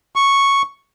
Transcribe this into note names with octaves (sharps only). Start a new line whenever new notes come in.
C#6